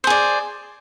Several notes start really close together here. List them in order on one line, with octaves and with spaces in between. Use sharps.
C5 G#4 D5